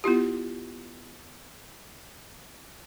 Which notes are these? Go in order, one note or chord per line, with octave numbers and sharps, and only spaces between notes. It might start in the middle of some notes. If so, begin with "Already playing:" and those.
B3 E4 F4 G4